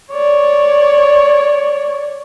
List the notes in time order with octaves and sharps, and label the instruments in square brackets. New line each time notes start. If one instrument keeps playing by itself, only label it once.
[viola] C#5 D5